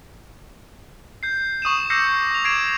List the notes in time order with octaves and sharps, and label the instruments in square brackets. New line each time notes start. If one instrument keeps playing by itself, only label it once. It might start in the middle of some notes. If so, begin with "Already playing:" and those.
[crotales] G6 C7
C#6 D#6 D#7 E7
D6 E6 G6 A#6 C7 C#7
C#6 F7
D6 G#6 C7 D7 E7 F7